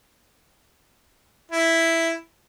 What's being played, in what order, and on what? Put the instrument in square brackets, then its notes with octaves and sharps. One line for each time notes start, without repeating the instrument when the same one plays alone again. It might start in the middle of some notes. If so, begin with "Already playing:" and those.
[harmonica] E4